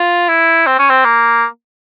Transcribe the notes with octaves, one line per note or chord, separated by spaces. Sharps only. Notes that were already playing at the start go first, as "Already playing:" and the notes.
Already playing: F4
E4
C4
C#4
C4
A#3